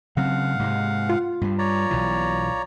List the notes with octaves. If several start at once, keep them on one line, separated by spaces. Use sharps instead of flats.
C#3 F#3 C4 F5 F#5
G#2 C3 G#3
F4
G2 G3
C#5 D5 A#5
B1 B2 E3